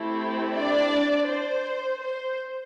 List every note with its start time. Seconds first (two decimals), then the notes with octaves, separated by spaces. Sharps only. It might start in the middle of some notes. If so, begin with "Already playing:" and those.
Already playing: A3 C4 E4 G4
0.55 D4 D5
1.28 C5
2.02 C5